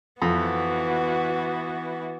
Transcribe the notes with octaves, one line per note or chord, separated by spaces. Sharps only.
F2 E3 B3 F#4